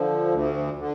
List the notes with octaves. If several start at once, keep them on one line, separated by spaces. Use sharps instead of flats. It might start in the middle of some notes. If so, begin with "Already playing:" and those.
Already playing: D3 F3
D2
D3